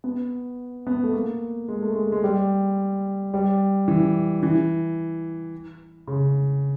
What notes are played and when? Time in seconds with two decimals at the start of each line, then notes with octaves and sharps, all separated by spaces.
0.04 B3
0.87 B3
1.04 A3
1.14 A#3
1.68 G#3
1.83 A3
1.96 G#3
2.12 G#3
2.24 G3
3.34 G3
3.88 E3
4.43 E3
6.07 C#3